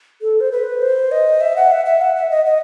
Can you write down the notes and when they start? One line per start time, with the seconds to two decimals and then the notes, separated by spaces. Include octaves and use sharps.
0.22 A4
0.41 C5
0.52 B4
0.82 C5
1.12 D#5
1.41 E5
1.56 F#5
1.72 E5
1.86 E5
2.01 F#5
2.15 E5
2.31 D#5
2.45 D#5